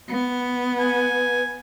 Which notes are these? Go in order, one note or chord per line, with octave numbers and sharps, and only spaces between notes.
B3
B4 G#5